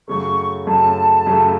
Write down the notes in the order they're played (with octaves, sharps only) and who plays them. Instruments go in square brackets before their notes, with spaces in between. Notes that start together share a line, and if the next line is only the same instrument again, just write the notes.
[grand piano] F#2 C#3 A3 [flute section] C#6
[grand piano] F#2 C#3 A3 [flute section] A5
[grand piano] F#2 C#3 A3